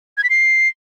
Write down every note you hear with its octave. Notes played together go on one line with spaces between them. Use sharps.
G#6
B6
C7